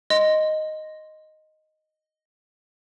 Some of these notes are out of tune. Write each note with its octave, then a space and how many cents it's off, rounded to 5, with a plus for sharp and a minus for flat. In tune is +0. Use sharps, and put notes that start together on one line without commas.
D#5 +0 C6 +0